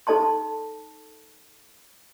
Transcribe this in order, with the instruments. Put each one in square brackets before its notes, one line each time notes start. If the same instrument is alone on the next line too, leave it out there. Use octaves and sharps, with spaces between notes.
[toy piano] D#4 A4 D5 A5 C6